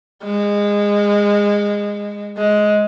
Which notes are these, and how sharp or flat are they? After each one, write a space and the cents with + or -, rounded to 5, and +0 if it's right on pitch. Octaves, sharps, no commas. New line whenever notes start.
G#3 -20
G#3 +10